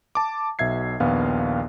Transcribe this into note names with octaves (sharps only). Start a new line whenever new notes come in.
A5 D6
B1 B2 E5 G#6 C7
A#1 D#2 B3 F5